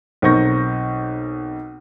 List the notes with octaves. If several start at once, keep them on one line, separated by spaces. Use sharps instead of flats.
B1 C4 A#4 C#6 G6 A#6